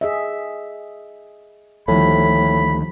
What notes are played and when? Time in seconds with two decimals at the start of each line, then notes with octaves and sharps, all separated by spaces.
0.01 G#4 D#5 E5
1.88 D2 A2 D3 D#3 F3 G3 B5